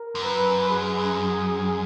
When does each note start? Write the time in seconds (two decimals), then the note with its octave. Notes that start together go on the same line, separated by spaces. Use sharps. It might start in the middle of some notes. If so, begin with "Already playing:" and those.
Already playing: A#4
0.15 F#2
0.24 B4
0.70 G#4